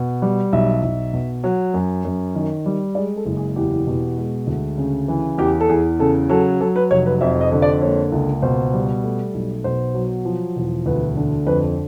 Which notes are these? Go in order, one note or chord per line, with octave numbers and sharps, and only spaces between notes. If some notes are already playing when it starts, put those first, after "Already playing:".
Already playing: B2
G3
B1 E5
B1
B2
F#3
F#2
F#2
D#3
G3
G#3 D5
A4
F#1
G#4
E2 G4
B2
G#3
D2
C#3
E3
E2 G4
A4
E2 G#4
C#3 A4
F#3 A4
F#3 A4
B4
F1 C#5
B4
F2 E5
D#5
D3
D5
A#3 C#5
C#2
B2 C5
G3
A3
B1
B2 C5
F#3
F3
E1
D2 B4
D3
F2 B4